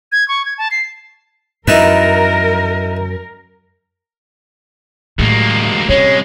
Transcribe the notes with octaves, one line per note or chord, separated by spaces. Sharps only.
G#6
C#6
G#6
A5
C7
F#2 D#4 E4 A#4 B4
D2 A2 F#3 G#3 A#3
C3 G3 G#3 C#4 C#5